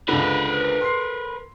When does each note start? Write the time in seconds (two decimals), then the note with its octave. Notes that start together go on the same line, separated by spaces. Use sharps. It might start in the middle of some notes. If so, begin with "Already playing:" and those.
0.09 C#2 D3 A#4 B4
0.81 C6 C7